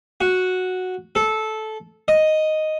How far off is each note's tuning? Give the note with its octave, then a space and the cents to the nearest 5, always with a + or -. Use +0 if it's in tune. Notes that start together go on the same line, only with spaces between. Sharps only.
F#4 -5
A4 -15
D#5 +0